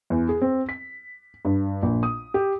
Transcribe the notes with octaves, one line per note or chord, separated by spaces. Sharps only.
E2
G#4
C4
B6
G2
A#1
D#6
G4